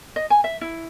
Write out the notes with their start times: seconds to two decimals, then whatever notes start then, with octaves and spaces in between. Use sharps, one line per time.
0.16 D#5
0.30 G#5
0.44 E5
0.61 E4